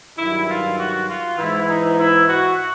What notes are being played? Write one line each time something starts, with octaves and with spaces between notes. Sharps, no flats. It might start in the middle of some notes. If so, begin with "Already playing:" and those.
G2 D#3 F#3 E4
F4
F#4
F4
G#2 E3 E4
D#4
E4
F#4